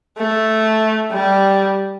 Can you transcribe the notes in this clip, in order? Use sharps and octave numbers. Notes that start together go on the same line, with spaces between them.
A3
G3